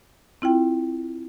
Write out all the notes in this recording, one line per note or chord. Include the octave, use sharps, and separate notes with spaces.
C4 E4 F4 G5